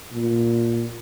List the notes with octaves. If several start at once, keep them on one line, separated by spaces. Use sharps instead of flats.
A#2